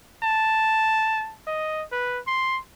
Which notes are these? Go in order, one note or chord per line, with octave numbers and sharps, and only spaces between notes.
A5
D#5
B4
C6